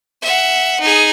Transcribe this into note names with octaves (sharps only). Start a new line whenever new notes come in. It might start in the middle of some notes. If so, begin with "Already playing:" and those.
E5 F#5
D#4 G#4